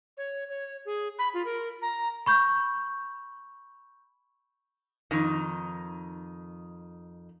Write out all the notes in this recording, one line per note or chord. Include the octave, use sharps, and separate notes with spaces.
C#5
C#5
G#4
B5
F4
A#4
A#5
B5 C#6 G6
F2 D#3